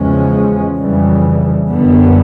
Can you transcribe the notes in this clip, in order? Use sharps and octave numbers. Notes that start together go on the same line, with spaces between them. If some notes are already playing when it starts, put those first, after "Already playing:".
Already playing: E2 C#3 F3 G#3 C#4
F2 C#3 E3 G3
F#2 D3 G3 B3